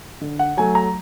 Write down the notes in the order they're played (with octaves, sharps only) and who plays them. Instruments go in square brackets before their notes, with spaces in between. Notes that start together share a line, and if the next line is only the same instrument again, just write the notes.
[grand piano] D3
F#5
F#3 A3 G#5
A#5